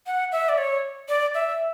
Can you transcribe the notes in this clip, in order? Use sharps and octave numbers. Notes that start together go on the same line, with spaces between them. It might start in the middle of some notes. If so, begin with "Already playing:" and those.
F#5
E5
D5
C#5
D5
E5